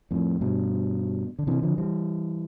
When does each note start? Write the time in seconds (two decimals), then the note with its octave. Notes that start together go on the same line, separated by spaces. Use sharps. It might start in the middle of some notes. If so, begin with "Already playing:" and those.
0.11 F2 A2
0.41 G2 B2
1.39 D3
1.47 C3 E3
1.63 D3 F3
1.78 E3 G3